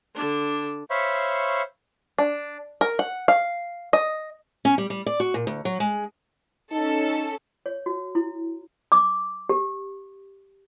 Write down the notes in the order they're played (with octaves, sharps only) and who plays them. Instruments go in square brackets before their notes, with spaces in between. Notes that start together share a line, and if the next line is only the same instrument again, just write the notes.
[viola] D3 D4
[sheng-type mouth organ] C5 C#5 E5 F5 B5 C#6
[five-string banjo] D4
A#4
F#5
F5
D#5
[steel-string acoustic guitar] C#4
G3
G3
D5
F#4
A#2
D2
F#3
G#3
[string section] C#4 A4 [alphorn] D#4
[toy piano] C#5
F#4
E4
D6
G4